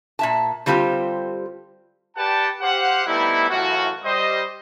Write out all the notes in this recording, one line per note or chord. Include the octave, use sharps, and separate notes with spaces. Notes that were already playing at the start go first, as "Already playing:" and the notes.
A#2 E5 A5
D3 G3 C4 F4 G4
G4 B4 D5 F#5 G5 A5
G4 C5 F5 F#5
G3 A3 B3 C4 D#4 E4
F#2 A2 E3 F4 F#4
G3 C5 D#5